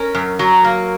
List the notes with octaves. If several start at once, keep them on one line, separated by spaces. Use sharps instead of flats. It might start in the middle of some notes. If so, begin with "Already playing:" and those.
Already playing: C#4 A#4
F#2
F#3
A#3